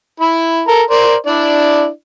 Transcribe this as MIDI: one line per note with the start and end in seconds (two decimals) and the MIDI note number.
0.20 0.62 64
0.20 0.62 83
0.68 0.82 69
0.68 0.82 70
0.68 0.82 82
0.90 1.15 70
0.90 1.15 72
0.90 1.15 74
1.26 1.88 62
1.26 1.88 64
1.26 1.88 74